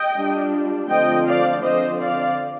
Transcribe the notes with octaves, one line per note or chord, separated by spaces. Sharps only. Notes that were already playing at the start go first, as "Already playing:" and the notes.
Already playing: D#5 G5
G3 D4 F4
D3 F3 A3 C4 F4 D#5 G5
D5 F5
D3 F3 C4 C5 D#5
D5 F5